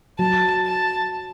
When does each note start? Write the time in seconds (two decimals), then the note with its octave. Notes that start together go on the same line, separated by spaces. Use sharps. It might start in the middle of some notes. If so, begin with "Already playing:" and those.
0.19 F#3 A5
0.66 A5